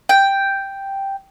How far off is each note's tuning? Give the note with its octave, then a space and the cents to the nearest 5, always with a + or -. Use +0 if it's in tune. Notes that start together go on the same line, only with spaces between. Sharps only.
G5 +0